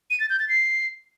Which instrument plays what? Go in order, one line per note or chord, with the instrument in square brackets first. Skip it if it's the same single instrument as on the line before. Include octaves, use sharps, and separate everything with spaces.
[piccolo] D#7
A6
G6
A6
C7